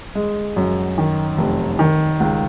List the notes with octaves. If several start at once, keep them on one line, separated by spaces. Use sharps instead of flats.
G#3
F#2
D#3
F1
D#3
C#2